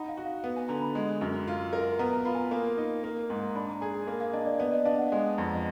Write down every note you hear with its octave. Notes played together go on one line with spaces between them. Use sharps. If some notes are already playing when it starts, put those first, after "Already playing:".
Already playing: D#4 F#5 A#5 B5
F5
F#4
F5
B3
G#5
D3 A#5
B5
G#3
F#2
F4
A#4
B3 A#5
A#5
F4 B5
G#5
A#5
A#3
D#4
A#3
G#2
D4 B5
A#5
G#4 G#5
G#5
A#3
F5
D4 D#5
D5
B3 D5
D#5
D4 F5
F#5
G#3 G#5
F2 A#5